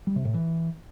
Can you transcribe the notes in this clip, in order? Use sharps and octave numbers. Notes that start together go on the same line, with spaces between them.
G3
C3
A2
E3